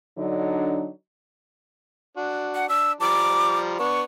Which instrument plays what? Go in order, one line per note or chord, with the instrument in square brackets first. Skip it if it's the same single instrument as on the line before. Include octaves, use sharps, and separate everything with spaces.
[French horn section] D3 F#3 D4 D#4
[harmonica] D4 F#4
[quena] F#5
[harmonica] D4 [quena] E6
[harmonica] F3 G3 A#5 [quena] D6
[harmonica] B3 D4 [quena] C#6